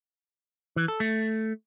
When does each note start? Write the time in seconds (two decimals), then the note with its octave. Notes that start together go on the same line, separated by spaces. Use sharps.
0.76 E3
0.88 A4
1.00 A3